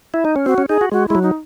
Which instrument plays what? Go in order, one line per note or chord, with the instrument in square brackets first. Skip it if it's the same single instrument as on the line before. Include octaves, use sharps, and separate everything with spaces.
[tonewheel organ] E4
D#4
C#4
[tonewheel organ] C4 [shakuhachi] F#4
[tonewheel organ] C#4
[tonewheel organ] D#4 [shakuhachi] G#4
[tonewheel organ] F#4
[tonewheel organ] G#3 [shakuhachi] F#4
[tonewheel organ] G#3 [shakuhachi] E4
[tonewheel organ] F#3
[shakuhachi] D#4